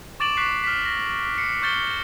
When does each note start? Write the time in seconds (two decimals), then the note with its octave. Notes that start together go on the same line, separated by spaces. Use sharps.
0.20 C#6 D6 A6 D7 E7 F#7
0.37 C#6 F#6 B6 C7
0.64 F6 B6
0.85 A#6
1.38 C7 C#7
1.62 C#6 F6 G6 A6 C#7 G7